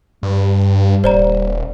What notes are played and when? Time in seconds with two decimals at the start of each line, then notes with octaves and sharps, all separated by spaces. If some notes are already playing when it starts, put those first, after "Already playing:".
0.23 G2 G3
1.04 D#1 C5 D5 A#5